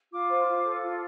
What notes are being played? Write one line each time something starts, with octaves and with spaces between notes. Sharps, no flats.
F4 D6
C5
F4
A4
F4